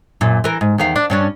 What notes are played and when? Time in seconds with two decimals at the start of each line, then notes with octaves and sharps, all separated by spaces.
0.21 F#2 A#2
0.44 E3 A#4
0.61 G#2
0.78 E2 D#3 F5
0.96 D4
1.10 G2 C#4 D4